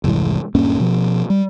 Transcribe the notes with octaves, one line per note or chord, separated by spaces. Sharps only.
F1 C2 G#2 E3
D#1 G2 A#3 C#4
B2 F3
G3